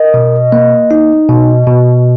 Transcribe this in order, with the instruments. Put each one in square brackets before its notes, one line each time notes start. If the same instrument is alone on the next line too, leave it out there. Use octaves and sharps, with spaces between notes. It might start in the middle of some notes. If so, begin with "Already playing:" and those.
Already playing: [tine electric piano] A#4 [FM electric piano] D#5
[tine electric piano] B2
A#3
D#4
B2
B2